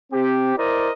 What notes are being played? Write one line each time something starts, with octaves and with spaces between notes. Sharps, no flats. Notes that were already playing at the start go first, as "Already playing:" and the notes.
C4 G4
E4 A#4 C5 D5 D#5